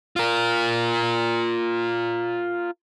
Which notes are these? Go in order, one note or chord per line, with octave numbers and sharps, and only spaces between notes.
F4 A#4